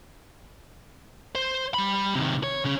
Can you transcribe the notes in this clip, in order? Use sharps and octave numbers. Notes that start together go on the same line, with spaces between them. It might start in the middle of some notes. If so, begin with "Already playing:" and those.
C5
G3 B5
C3 D#3
C#5
C#3 C#4